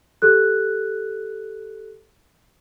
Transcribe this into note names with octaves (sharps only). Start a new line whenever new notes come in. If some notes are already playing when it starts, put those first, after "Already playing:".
G4 A4 F#6